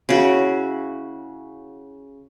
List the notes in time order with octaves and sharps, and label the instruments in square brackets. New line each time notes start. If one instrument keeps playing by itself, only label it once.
[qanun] C#3 E4 F#4